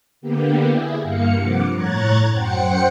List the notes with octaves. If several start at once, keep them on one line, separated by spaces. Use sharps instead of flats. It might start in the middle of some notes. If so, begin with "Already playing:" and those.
D3 A#3 B3 G4
E4 G#4
G2 A#3 F5 C#7
G2 C3 F3 F#5 D6
A2 C#5 A#5 F#6 G#6 A6
F#2 C5 F#5 G5 C#7